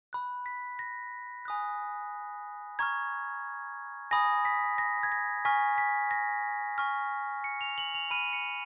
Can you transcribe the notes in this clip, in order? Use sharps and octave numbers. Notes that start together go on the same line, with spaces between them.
B5 F#6
B6
A#6
G#5 D#6 F#6
A#5 C#6 F6 G#6
G#5 B5 D#6 A#6
B6
A#6
G#6
A#6
G#5 C#6 F6 B6
B6
A#6
G#5 C#6 F6
C#7
F7
F#7
F7
B5 F6 D#7
C#7